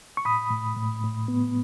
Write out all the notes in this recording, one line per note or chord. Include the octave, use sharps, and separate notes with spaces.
C#6
A2 B5 D#6
A2
A2
A2
B3